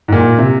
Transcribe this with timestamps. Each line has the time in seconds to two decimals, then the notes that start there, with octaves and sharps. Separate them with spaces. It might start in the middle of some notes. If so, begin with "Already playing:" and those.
0.08 G#2
0.13 A#2
0.38 C3